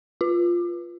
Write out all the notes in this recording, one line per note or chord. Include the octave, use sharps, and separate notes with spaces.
F4